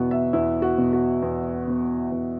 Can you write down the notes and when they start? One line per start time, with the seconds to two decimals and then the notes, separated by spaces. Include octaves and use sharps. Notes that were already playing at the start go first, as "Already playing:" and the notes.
Already playing: E2 B2 B3 E4 F#4
0.11 E5
0.33 E2 E4
0.62 F#4
0.78 B2 B3
0.93 F#4
1.22 E2
1.67 B2 B3
2.11 E2